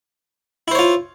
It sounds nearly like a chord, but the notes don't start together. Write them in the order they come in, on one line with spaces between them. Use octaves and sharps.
E4 C5 C#5 F4